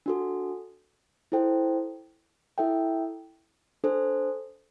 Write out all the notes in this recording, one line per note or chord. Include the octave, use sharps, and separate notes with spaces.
D4 F#4 A4
E4 A4 C5 G5
E4 A4 E5 G5
D4 A4 C5